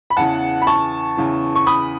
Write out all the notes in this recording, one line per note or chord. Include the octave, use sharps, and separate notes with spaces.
B5
E2 C#3 E3 F#5 A5
B5
A5 C#6
E2 C#3 E3
C#6
B5 D#6